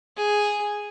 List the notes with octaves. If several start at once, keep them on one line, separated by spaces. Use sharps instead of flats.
G#4